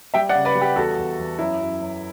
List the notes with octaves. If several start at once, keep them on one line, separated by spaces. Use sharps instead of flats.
G3 E5 G5
D5 F#5
C#3
B4 D5
G3
G4 B4
E2 F#4 A4
E2
E2
F#2 E4
F#2
F#2